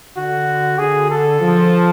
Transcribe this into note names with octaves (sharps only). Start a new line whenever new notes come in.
D3 F#4
D3 G#4
A4
F3